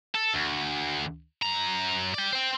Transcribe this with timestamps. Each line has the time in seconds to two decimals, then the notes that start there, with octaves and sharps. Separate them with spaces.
0.14 A4
0.34 D2
1.43 F#2 A#5
2.14 D5 G5
2.33 C5 G5